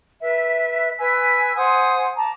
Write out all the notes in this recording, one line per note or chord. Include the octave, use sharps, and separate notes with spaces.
B4 E5
B4 G#5 E6
C5 F#5 G#5 D#6
A5 A#5 D6